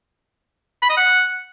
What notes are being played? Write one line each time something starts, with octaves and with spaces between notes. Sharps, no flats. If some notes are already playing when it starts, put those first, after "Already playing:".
B5
D#5
F#5